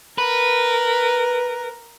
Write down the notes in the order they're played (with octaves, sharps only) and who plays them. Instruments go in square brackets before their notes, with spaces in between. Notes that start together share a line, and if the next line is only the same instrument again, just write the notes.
[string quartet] A#4 [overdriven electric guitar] B4